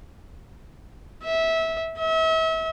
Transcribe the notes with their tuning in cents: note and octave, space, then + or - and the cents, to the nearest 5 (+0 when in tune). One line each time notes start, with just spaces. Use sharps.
E5 -20
E5 -35